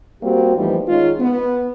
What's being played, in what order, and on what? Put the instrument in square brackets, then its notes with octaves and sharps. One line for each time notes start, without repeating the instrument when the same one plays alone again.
[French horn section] G3 A#3 C4 F#4 G4
A2 E3 F3 G3 B3 D#4
D#3 G#3 C#4 D#4 F4
B3